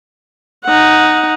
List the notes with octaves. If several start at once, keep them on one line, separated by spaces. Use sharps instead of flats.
D#4 F#5